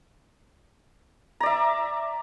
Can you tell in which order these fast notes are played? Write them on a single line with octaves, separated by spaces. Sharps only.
A#5 D5 E5